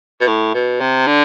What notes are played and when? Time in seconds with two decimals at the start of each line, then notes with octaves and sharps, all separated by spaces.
0.21 B2
0.27 A2
0.54 B2
0.80 C3
1.07 D3